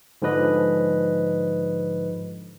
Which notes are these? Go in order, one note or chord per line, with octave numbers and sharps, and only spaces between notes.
G#2 D3 F3 B4 D#5